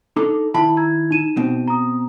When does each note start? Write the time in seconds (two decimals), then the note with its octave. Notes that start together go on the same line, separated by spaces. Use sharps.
0.16 D4 D#4 A4 D6
0.54 D#3 E4 A5 B5
0.77 A#5 E6 G#6
1.11 D#4 D#7 E7
1.37 B2 C4
1.68 A#5 D#6